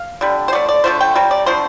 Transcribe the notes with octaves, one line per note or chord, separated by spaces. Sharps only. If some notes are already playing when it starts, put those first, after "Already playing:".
Already playing: F5
D3 G3
C5
D3 A3 D5
D5
D3 F3 A3 C5
G5
C3 G3
D5
D3 F3 A3 C5